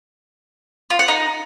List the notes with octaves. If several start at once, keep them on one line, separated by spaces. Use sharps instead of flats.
F4
F#5
D#4